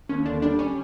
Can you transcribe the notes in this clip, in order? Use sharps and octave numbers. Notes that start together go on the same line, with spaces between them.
D#2 C#4
D3 D4
G3 D4
C#4